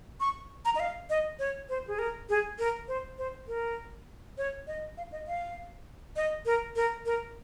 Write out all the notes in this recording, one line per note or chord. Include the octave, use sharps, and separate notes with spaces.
C#6
A#5
D#5
F5
D#5
C#5
C5
G#4
A#4
G#4
A#4
C5
C5
A#4
C#5
D#5
F5
D#5
F5
D#5
A#4
A#4
A#4